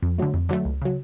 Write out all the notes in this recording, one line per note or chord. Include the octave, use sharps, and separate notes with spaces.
F2
D3 F#3 A3
F2
D3 F#3 A3
C#2
C#3 F#3